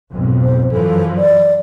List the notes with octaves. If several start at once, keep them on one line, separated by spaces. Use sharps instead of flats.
B1 F2 G#2
C5
F#2 E3 F3 A4
D5